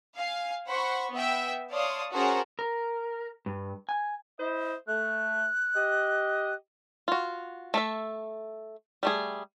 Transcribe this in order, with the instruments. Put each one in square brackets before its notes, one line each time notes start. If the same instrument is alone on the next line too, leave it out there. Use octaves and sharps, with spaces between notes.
[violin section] F5 G#5
C5 F#5 B5 C#6
B3 E5 G5
C#5 D5 F5 A5 C6 D#6
C#4 F#4 G#4 A#4 C5 A5
[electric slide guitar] A#4
G2
G#5
[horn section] E4 C5 D#5
[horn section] A3 [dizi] F#6
[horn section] G4 D#5
[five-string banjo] F4 F#4
A3 A4 E5
G3 A3 G#4